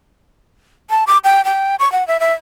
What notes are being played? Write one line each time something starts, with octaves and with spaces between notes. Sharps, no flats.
A5
D6
G5
G5
C#6
F#5
E5
E5